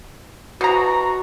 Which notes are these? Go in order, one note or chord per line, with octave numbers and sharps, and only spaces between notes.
B2 F#4 A#5